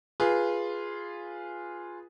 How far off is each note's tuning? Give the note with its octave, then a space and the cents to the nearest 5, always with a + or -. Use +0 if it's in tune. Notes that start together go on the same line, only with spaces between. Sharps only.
F4 +0 G#4 +0 B4 -10